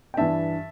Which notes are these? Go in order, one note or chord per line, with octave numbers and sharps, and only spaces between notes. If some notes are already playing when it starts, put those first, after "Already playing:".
G5
G2 E3 E5 A5